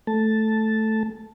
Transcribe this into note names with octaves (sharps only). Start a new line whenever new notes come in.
A3 A5